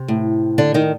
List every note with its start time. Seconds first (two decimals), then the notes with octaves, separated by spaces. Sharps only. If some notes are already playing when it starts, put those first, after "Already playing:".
Already playing: C3
0.08 A2
0.58 D3 D4
0.74 D#3 D#4